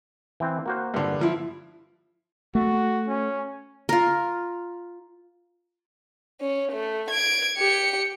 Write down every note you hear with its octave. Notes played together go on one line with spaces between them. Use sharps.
E3 C4
A#3 F#4 C5
G2 D3
F3 E4
A3 F#4
C#4
F4 A#4
C#4
A3
G#6 D7
G4 C#7